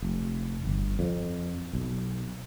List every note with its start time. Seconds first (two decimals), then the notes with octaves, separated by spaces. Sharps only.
0.02 F1
0.65 G1
0.99 F2
1.73 B1